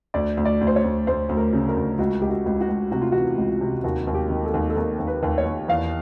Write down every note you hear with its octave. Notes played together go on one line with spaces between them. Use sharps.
D2 D5
D2
D5
D2
C5
C#5
D2
D2 C5
D2
A#4
C#3
A#4
D2
C#2 F#4
C#2 G4
F#4
C#2
F#4
C#2
C3 F#4
F4
E3 F#4
C#2
C3
D#2 F#4
D#2
G4
D#3
A4
D#2
A4
D#2 A#4
D#2
B4
D#2
C#5
D#2
E2 F5